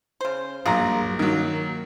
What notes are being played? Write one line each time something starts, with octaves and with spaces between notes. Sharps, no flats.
C#3 C5
A#1 G2 F#3 A#3 F4 G#4 A#5
D#3 F#3 A#3